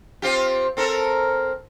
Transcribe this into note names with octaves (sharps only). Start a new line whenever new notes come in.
C4 F4 G4
C4 A4 A#4